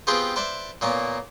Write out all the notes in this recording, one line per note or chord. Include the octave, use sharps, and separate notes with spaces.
B3 C4 F4 G4 G#4 B4
B4 C5 D5 E5
A#2 A#3 B3 C#4